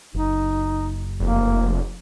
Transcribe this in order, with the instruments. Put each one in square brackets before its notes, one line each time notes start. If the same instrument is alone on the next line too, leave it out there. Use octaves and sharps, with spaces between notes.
[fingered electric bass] F#1 [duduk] D#4
[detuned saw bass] F1 [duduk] A#3